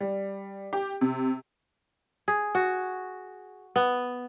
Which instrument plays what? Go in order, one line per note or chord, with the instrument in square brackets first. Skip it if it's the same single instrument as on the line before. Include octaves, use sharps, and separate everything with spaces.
[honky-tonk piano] G3
G4
C3
[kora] G#4
F#4
B3